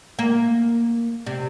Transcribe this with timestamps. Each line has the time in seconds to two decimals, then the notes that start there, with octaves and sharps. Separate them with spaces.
0.19 A#3
1.26 C3